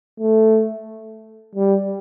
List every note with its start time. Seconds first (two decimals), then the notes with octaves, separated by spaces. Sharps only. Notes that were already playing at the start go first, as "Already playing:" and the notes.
0.20 A3
1.55 G3